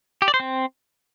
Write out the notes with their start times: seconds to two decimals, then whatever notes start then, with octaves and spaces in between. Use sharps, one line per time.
0.22 G4
0.28 D5
0.34 C5
0.40 C4